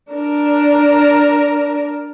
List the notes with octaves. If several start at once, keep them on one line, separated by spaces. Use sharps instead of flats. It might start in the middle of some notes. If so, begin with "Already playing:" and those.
D4 A#4